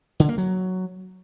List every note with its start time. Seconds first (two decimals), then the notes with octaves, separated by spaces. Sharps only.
0.20 D3
0.29 A#3
0.38 F#3